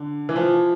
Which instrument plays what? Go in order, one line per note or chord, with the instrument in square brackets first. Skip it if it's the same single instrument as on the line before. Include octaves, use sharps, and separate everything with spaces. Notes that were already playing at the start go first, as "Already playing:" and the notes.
Already playing: [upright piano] D3
E3
F3